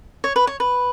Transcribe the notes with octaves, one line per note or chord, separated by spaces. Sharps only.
C#5
B4
C#5
B4